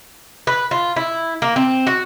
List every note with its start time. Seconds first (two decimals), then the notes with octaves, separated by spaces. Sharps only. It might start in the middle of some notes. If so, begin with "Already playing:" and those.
0.47 B4
0.71 F4
0.96 E4
1.42 A#3
1.56 C4
1.87 F#4